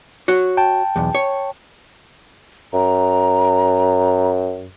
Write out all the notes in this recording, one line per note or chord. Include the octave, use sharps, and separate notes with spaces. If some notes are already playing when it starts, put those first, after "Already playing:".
F#4 C#5
G5 A5
B1 E2
C#5
F#2 A#5